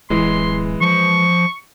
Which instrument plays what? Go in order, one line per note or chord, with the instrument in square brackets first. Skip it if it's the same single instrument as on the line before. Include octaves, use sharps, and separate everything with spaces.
[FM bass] D1 [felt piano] E3 G#3 [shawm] C6
[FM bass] F3 [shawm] C#6